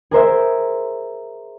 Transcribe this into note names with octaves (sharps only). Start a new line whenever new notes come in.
G#4 A#4 C5 E5